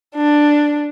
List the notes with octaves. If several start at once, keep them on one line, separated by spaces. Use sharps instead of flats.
D4